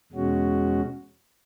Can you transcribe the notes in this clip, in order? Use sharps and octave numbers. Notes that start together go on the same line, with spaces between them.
E2 B2 G#3 C#4 F#4